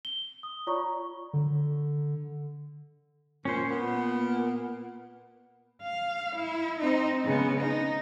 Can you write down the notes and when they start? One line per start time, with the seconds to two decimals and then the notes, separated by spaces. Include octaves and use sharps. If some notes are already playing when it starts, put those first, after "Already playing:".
0.05 G7
0.43 D#6
0.67 F4 C#5 D5 A#5 C#6
1.33 D3
3.45 A#2 C#4 C5
3.71 A#2 B3
5.82 F5
6.35 E4
6.79 C4 D#4
7.24 C#3 B3
7.60 D#4